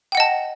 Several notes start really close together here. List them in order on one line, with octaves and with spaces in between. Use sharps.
G5 F#5 D#5 A5